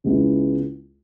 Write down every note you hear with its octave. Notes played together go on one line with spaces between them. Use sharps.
C#2 C#3 G#3 B3 E4